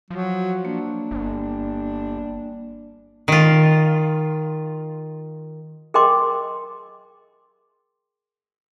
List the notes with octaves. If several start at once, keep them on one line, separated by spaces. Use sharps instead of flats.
F3 F#3
A#3 D4
G1
D#3 F4
G#4 A#4 D#5 G5 C6 D6